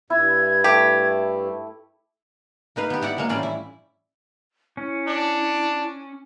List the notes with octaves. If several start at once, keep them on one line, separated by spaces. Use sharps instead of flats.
G2 E4 G#6
A3 G4
A#3 D#4 B4 F5
B3 G4
B3 E4 D5 F#5
F#3 G#3 A#3
A2 E3 G3 C#4 F4 D5
E4
C#4 E4
D4